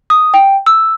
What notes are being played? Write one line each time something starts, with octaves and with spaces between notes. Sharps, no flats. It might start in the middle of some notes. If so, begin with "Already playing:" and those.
D#6
G5
E6